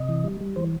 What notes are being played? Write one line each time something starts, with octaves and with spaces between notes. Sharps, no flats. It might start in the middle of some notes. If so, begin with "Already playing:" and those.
Already playing: C3 D#5
E3
G3
G3
E3 C5